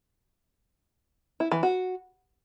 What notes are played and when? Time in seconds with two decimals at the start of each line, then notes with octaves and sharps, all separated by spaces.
1.40 E4
1.52 E3
1.63 F#4